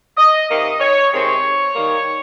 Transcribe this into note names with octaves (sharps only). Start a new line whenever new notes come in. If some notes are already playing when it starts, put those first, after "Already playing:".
D#5
C3 D#3 A#3 D#5
C#5
C3 D#3 G#3 C4 C#5
D#3 G3 A#3